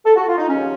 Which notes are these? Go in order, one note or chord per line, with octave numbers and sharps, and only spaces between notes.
A4
F#4
F4
D#4
D#2 C#3 F3 C#4